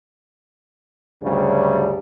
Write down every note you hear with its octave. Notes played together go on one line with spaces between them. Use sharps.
D2 G2 C#3 F#3 G3